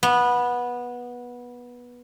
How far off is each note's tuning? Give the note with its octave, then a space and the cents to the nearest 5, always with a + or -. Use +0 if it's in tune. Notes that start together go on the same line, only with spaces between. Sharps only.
B3 -15